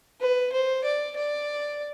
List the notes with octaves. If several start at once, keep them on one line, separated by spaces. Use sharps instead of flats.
B4
C5
D5
D5